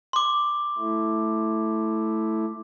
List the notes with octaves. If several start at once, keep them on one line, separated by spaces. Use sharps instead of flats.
C6 D6
A3 E4